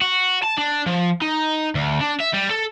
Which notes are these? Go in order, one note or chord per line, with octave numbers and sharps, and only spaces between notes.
F#4
A5
D4
F3
D#4
D2
D4
E5
G3
A4